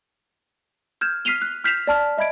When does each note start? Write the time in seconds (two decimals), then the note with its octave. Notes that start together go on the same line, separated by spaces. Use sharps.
1.01 F6 G6 G#6 E7
1.25 F6 B6 C7 D#7 F7 G7
1.42 F#6
1.64 F6 G6 B6 C7 E7 F7
1.87 D5 A5 F6
2.18 D#5 E5 B5 G#6 D7